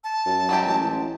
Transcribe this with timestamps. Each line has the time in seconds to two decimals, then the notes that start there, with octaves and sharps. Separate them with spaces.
0.04 A5
0.26 F#2
0.49 F#3 G#3 G4
0.65 A1
0.84 A1